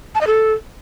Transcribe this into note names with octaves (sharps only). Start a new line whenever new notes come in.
A5
D#5
A4